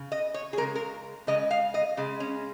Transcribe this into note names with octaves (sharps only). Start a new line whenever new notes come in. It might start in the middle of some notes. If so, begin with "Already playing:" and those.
Already playing: C#3
D#5
C#5
G#4
C#3 G#3 A#4
A#4
C#3 G#3 D#5
F5
D#5
C#3 G#3
C#4